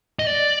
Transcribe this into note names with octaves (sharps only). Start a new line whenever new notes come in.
D#5
D5